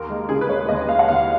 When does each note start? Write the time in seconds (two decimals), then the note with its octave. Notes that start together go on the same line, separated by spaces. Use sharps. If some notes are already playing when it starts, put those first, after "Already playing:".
Already playing: D#2 A#4
0.10 G#3
0.29 C#3 G#4
0.41 B4
0.49 G#3 C#5
0.69 D#2 D#5
0.88 D#2 F5
0.99 F#5
1.08 D#2 F5